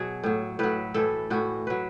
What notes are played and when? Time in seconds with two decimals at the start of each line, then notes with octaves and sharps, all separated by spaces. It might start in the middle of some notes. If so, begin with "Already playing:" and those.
Already playing: B2 F#3 F#4 G#4
0.24 A2 F#3
0.59 A2 F#3 B4
0.94 A2 E3 A4
1.30 A2 E3 F#4
1.67 F#3 B4